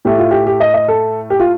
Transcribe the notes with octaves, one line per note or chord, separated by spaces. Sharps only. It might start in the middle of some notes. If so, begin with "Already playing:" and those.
A2 A3 G4
F4
G4
G4
D#5
D#5
A4
G4
F4